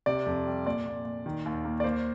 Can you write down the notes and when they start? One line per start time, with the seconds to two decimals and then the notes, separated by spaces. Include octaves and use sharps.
0.06 C3 D5
0.26 F2
0.46 G3
0.66 A#2 D5
0.86 A#2
1.05 A#2
1.26 D#3
1.46 D#2
1.65 A#3
1.80 D5
1.84 A#3 C5